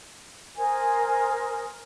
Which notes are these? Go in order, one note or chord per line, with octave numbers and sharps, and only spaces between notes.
A#4 C5 G#5 D#6